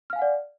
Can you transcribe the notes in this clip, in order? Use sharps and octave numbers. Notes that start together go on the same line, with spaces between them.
D5 F5 F#5 G#5 F6